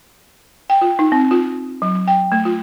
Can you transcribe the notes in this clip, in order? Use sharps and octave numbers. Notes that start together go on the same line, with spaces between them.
G5
F4
D#4
C4
F4
F#3
G5
A3
F4